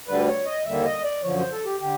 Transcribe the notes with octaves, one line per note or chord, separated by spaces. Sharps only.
D2 D3 G3 B4
C#5
D#5
D#2 D3 G3 A#3 E5
D#5
D5
F#2 D3 F3 C#5
C5
A4
G4
D3 G4